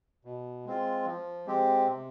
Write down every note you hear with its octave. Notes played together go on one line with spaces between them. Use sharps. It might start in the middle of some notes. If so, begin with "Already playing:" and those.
B2
G#3 C4 F4
F3
G#3 C4 G4
C3